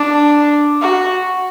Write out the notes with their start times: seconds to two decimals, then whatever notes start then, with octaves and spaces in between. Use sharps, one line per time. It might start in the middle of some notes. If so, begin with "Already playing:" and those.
Already playing: D4
0.82 F#4